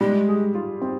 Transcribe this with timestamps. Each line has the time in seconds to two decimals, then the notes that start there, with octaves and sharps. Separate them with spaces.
0.01 G3 G#3
0.28 G#4
0.55 F4
0.82 C4